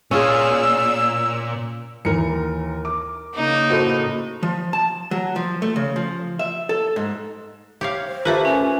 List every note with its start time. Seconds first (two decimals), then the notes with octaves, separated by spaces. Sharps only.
0.11 A#2 C#4 F4 G#4 E6
2.05 D#2 E3 A#4 C#7
2.85 D6
3.35 C#3 A#3 D#4
3.70 A2 F#4 A4 C5 D#5
4.43 F3
4.73 A5
5.11 F#3
5.36 F3
5.62 A3
5.76 C#3
5.96 F3
6.39 E5
6.69 A4
6.96 G#2
7.81 G4 C#5 F5
8.07 C5
8.25 A3 A#3 F4 G4 B4
8.45 C#4 G#5